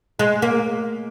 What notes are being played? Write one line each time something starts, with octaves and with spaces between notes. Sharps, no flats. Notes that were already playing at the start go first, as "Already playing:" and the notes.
G#3
A#3